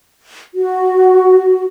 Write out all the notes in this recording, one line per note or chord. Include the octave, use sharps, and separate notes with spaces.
F#4